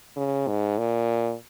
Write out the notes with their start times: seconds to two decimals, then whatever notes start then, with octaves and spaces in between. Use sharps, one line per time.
0.16 C#3
0.48 G#2
0.78 A#2